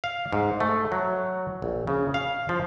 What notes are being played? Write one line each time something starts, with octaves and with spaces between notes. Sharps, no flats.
F5
G#2
A3
F#3
A#1
C#3
F5
F3